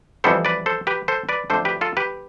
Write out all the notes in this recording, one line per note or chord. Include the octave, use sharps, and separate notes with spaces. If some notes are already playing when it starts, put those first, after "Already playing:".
F2 E3 G3 B3 A4 C5
B4 D5
A4 C5
G4 B4
A4 C5
B4 D5
F2 D3 A3 D4 A4 C5
G4 B4
F4 A4
G4 B4